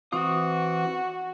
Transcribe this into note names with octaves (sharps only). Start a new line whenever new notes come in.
E3 C4 F#4 D#6